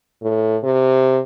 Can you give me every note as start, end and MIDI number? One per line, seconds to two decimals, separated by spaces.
0.22 0.57 45
0.64 1.20 48